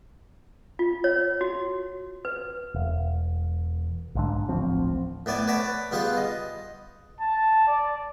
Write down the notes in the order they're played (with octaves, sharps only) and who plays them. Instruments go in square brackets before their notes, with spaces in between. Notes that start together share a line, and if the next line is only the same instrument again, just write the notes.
[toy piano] F4
C#5
F#4
B4
[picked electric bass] E1
B1 G#2 D3
D1 A1 F3 C4
[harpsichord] A2 B3 D5 G#5 A5
B4 C#5 D5 F#5 A5
G2 B3 F4 G#4 F#5 C6
D#5
[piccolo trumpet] A5
D5